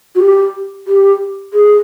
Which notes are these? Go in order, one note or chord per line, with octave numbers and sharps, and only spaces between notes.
F#4
G4
G4
G#4